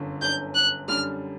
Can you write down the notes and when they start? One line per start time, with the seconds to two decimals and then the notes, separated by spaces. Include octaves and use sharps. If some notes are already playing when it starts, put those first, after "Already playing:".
Already playing: G1 F#2 D3
0.21 G1 F#2 D3 G6
0.55 F#6
0.88 F#2 D3 G3 F6